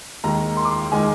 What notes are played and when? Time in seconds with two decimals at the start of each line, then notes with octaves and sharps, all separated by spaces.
0.24 D#2 D#3 G#3 A#5
0.57 C6
0.65 D6
0.71 C6
0.92 D#3 G#3 G#5